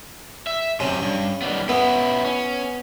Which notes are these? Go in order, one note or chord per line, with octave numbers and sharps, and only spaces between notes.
E5
F#2 C3 C#4
G2
D#3 G3 B3
B3 C#4 E4
C#4